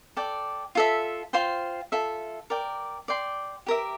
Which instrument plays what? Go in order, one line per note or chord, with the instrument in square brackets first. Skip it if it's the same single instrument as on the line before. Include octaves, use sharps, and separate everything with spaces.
[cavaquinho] A4 D5 G5
F4 A4 E5
F4 C5 G5 C6
F4 A4 E5
A#4 D5 G5
D5 G5 C6
G4 A#4 E5